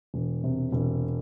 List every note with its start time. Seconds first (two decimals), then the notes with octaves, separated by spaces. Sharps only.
0.14 E1
0.44 C3
0.72 E1